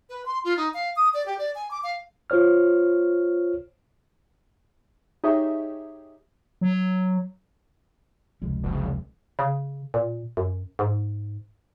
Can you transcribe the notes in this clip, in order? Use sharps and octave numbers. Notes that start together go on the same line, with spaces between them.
B4
C6
F4
D#4
F5
D#6
D5
G4
D5
G#5
D6
F5
F4 C5 C#5 F6
D#4 G4 G#4 C#5 E5
F#3
F1 C#2 G#3
F#1
C#3
A#2
F#2
G#2